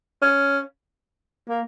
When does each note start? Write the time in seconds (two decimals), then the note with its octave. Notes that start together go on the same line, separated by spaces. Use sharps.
0.22 C#4
1.49 A#3